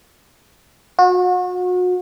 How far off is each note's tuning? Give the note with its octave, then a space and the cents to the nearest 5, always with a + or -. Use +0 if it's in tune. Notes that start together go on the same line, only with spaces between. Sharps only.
F#4 -35